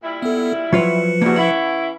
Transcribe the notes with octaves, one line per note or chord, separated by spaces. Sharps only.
A#2 G3 E4
B3 A4
F3 F#3 F4 B4 C#5 C#7
E2 G2 A#3 F#4
E3 C#4 E4 F#5